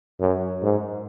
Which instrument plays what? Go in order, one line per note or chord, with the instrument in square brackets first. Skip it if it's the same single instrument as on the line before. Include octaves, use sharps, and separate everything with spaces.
[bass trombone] F#2
G#2